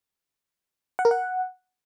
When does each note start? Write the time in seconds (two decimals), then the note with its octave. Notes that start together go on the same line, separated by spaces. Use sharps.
0.99 F#5
1.05 A#4
1.11 F#5